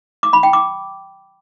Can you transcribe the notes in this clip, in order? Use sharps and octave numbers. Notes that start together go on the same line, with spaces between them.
D6
B5
G5
D6